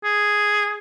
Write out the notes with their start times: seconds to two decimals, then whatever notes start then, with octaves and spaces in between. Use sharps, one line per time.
0.04 G#4